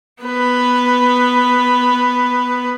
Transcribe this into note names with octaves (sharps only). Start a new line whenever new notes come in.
B3 B4